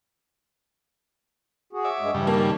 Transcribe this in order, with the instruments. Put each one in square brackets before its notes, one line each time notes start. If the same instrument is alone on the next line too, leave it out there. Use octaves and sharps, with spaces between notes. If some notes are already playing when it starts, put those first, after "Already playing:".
[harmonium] F#4 G#4
[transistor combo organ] C#5 E5 D6
[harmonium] G2 G#3
[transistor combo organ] G2 C#3 G3 [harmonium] E3
[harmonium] D#3 A5 [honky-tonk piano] A#3